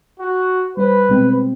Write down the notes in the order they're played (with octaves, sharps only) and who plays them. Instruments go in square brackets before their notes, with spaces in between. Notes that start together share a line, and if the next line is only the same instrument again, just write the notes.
[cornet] F#4
[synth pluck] G3 C5 [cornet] B4
[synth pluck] B2 G#3 C4